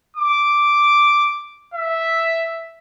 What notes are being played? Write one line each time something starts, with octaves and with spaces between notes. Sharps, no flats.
D6
E5